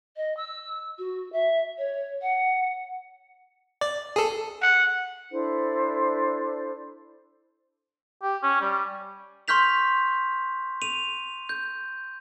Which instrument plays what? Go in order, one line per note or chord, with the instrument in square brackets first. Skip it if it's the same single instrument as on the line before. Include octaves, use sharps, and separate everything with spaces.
[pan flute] D#5
E6
F#4
E5
C#5
F#5
[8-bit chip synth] D5
G#4 A4
[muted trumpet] F#5
[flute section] D4 E4 A4 C5
[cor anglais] G4
C#4
G3
[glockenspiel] C6 C#6 F6 G6 B6 F7
D#7 F7
G6